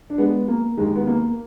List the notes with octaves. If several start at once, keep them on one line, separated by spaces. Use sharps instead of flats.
D4
G#3 B3
A#3
D#2 D#3 G#3
B3
A#3